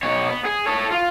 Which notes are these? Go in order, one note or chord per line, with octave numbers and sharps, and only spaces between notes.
B2 C#5
B3
G#4
A4 C#5
F4